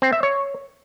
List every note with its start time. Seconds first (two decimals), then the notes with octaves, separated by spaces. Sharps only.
0.02 C4
0.13 E5
0.23 C#5